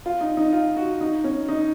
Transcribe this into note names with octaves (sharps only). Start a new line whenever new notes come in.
F4
D#4
D#4
F4
F#4
D#4
C#4
D#4